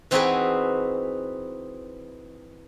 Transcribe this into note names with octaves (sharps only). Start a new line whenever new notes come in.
E3 C4 D#4 F#4 G#4 B4